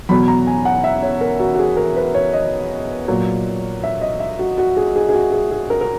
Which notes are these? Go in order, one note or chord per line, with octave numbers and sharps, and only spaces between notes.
E2 B2 F#3 B5
A#5
G#5
F#5
E5
C#5
A#4
F#4
F#4
G#4
A#4
B4
C#5
D#5
A#2 F#3
E5
D#5
E5
F#4
F#4
G#4
G#4
G#4
F#4
G#4
G#4
A#4
A#4